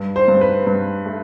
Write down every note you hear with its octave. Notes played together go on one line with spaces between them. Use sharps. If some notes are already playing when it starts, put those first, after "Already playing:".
Already playing: G2
C5
G2
B4
G2
A3